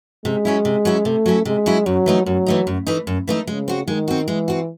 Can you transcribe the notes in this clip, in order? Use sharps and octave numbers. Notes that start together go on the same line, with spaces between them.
C3 G#3
F#3 C#4 E4
C3
F#3 C#4 E4
C3 A3
F#3 C#4 E4
C3 G#3
F#3 C#4 E4
F#2 F#3
E3 A3 D#4
F#2 F#3
E3 A3 D#4
F#2
E3 A3 D#4
F#2
E3 A3 D#4
C#3 G#3
C4 F#4
D#3 G#3
C4 F#4
E3 G#3
C4 F#4